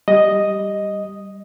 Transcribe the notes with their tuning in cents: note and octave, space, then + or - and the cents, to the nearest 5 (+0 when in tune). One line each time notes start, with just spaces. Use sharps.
G3 +0 D#5 +0